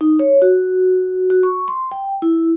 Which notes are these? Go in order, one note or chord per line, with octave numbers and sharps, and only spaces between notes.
D#4
C#5
F#4
F#4
C#6
C6
G5
E4